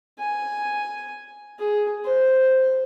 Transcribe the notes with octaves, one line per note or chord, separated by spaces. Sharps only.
G#5
G#4
C5